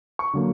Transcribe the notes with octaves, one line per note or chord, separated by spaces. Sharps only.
C#6
D3 F#3 A#3